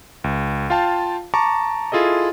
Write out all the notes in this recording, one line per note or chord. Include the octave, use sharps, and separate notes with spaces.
C#2
F4 F5 G5 A5
A5 A#5 C#6 D6
E4 F4 G#4 A4 D#5